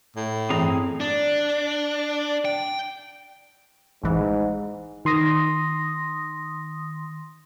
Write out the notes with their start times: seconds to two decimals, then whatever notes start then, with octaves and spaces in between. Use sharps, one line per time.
0.16 A2
0.50 G2 E3 C4 G#4 A#5
1.00 D4
2.45 G5
4.03 A1 G#2 E3
5.05 D#3 C6 D#6 A#6